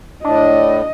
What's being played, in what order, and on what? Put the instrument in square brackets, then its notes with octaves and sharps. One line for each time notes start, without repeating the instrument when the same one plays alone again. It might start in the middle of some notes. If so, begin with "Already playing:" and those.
[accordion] A2 [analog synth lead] D4 [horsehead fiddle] D#5